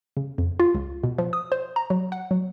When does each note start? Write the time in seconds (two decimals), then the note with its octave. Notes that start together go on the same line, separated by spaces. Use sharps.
0.17 C#3
0.38 F2
0.60 F4
0.75 C#2
1.03 B2
1.18 F3
1.33 D#6
1.52 C5
1.76 A#5
1.90 F#3
2.12 F#5
2.31 F#3